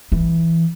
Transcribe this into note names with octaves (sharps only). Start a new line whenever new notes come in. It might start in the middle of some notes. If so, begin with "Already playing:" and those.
E3